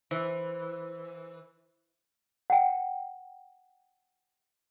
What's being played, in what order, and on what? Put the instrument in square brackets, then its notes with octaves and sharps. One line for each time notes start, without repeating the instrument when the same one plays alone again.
[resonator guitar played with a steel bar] E3 [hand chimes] C5
[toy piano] F#5 G5